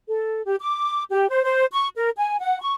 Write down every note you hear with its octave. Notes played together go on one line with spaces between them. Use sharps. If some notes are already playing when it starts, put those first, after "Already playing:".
A4
G4
D6
G4
C5
C5
C#6
A#4
G#5
F#5
C#6